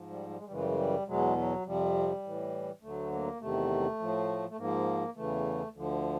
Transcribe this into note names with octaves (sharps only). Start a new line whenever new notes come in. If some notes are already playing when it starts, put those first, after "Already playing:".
Already playing: G#2 F3
G3
G3
G#3
G3
F#2 C#3 E3 G#3
G3
G#3
G3
E2 B2 F#3 G#3
F#3
F2 C3 F3 G3
A2 E3
D2 D3 F#3 A3
A#3
E2 C3 D#3 A3
A2 F3
A3
G#2 F3 A#3
E2 C#3 E3 A3
D2 D3 F3